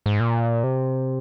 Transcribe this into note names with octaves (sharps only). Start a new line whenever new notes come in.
G#2
A#2
C3